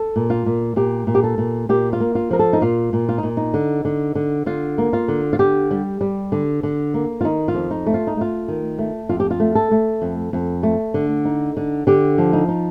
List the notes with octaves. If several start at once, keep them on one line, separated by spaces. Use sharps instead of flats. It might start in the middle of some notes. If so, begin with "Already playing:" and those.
Already playing: A4
A#2
F4
A#2
A#2 G4
A#2
G4
A4
A#2
A#2 G4
F4
A#3
F4
F3 A#4
A4
D#4
A#2 F4
A#2
F4
D#4
A#2
D#4
D3
D3
D3
D3 F4
A#3
F4
D3
F4
D3 G4
G3
G3
D3
D3
A#3
F4
D#3 D#4
F4
F2
D#4
A3
F4
D#4
A3 F4
D#3
A3
F2 F4
G4
F4
A3
A4
A3
F2
F2
A3
D3
D#4
D3
D3 G4
F3
D#4
D#4